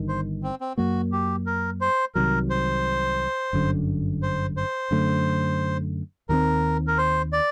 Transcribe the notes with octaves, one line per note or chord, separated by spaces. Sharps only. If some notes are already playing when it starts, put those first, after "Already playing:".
Already playing: G1 G2 D#3
C5
C4
C4
F#2 F#3 A#3 F#4
G4
A#4
C5
C2 C3 D#3 F#3 A#4
C5
G1 F#2 D3
C5
C5
F#2 D3 A3
D#2 D#3 G3 C4 A#4
A#4
C5
D5